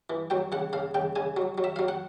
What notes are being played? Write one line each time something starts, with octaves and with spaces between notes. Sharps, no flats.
E3
F#3 G5
C#3 F#5
C#3 F5
C#3 G5
C#3 G#5
F#3
F#3
E5
F#3 F5
F#5